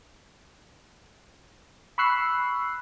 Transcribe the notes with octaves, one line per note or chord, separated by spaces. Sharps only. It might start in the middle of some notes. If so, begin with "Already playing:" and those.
B5 C#6 E6 F#6 C7